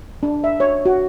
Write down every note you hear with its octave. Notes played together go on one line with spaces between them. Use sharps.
D4
E5
C#5
F#4